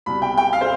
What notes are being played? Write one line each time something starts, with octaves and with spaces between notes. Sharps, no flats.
C2 B2 B5
G5
G5
F5
C5